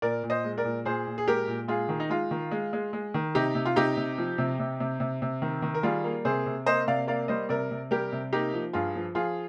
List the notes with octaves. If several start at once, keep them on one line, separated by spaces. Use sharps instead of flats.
A#2 A#4 D5
A#2
C5 D#5
G#3
A#4 D5
A#2
A#2 G#4 C5
A#2
G#4
G#3 G4 A#4
A#2
G#3 F4 G#4
D#3
D#4
G#3 F4
D#3
G#3
G#3
G#3
D#3
C3 D#4 G4
C3
F4
C3 D#4 G4
C3
F3
C3
C3
C3
C3
C3
D#3
D#3
A#4
G3 F4 G#4
A#3
C3 G#4 C5
C3
A#3 C5 D#5
C3 D5 F5
A#3 D5 F5
G3 C5 D#5
C3 A#4 D5
C3
G3 G4 A#4
C3
A#3 D#4 G4
F3
G2 F4 G#4
F3
F3 F4 G#4